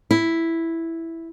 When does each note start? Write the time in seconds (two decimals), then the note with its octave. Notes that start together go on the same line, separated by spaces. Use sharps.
0.11 E4